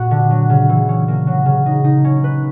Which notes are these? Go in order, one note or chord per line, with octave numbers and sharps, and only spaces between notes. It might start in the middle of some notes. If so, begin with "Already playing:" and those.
Already playing: A#2 A#3 F#4
D3
F#3
C#3
E3
C#4
A#3
F#3
C#3
D#4
D#4
C#4
B4